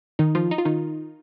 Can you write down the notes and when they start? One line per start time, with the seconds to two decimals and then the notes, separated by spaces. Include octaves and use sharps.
0.19 D#3 D#4
0.35 F3 F4
0.51 D#4
0.58 F4
0.65 D#3 D#4